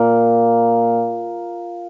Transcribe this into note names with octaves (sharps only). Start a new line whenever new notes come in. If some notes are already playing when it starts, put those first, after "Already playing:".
Already playing: A#2 A#3